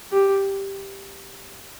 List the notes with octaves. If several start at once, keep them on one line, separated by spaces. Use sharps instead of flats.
G4